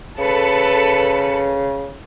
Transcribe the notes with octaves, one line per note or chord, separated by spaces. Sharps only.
C#3 A4 B4 C#7